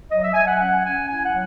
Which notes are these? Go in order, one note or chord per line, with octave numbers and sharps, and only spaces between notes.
F#3 D#5
E5
F#3 G#5
F#5
C#4 F#5
C#4 G#5
E4 G#5
F#5
F#3